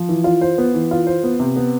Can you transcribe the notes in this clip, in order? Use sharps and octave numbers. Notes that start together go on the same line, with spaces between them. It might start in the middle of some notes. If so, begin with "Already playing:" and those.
Already playing: F3
E3
F4
C5
B3
E3
F4
C5
B3
C3
B3